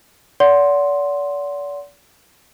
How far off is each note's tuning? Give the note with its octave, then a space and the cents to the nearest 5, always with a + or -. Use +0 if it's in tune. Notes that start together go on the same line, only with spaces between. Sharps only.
D5 -40 F#5 +0 C6 +0